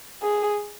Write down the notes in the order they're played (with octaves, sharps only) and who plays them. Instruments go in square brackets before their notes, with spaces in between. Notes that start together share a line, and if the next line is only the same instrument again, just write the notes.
[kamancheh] G#4